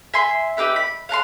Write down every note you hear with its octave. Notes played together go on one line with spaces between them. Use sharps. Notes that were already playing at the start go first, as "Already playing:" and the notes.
E5 G#5 C6
D#4 G4 B4 E5
B5
F5 F#5 A5 C6